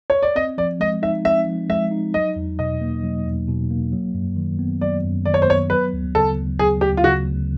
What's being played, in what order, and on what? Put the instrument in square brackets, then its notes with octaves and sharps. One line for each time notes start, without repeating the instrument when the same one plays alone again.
[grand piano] C#5
D5
[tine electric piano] C4 [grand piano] D#5
[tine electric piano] F3 [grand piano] D5
[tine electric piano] G#3 [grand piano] D#5
[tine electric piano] D#4 [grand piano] E5
[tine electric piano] C4 [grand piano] E5
[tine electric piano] F3
[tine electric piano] G#3 [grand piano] E5
[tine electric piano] D#4
[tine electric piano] F#3 [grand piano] D#5
[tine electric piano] E2
[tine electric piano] B2 [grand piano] D#5
[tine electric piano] A#3
F#3
E2
B2
A#3
F#3
F#2
D#3
B3
[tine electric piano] F#3 [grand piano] D5
[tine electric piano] F#2
[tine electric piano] D#3 [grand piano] D5
[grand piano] C#5
C5
[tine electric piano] B3 [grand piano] C#5
[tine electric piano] F#3 [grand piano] B4
[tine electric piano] D2
[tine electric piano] C#3 [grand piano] A4
[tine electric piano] D2
[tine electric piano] F#3 [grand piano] G#4
[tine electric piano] D2 [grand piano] G4
[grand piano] F4
[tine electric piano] C#3 [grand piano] F#4
[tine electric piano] D2